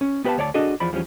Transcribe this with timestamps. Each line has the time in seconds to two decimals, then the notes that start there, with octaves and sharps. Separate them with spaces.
0.01 C#4
0.24 B3 G4 B4 C#5 F5 A5
0.38 D2 C#5 D5 A5
0.54 D4 F#4 G#4 A4 D#5
0.80 E2 F3 D5 B5
0.93 E2 F3 G3 C#4